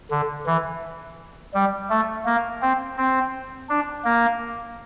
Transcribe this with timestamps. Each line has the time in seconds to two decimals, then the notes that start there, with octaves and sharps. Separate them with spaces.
0.11 D3
0.46 E3
1.54 G3
1.90 A3
2.25 A#3
2.62 C4
2.98 C4
3.69 D4
4.05 A#3